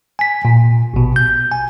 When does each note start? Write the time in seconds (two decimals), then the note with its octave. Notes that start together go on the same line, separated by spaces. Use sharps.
0.19 G#5 B6
0.45 A#2
0.94 A1 B2
1.16 G6
1.52 G#5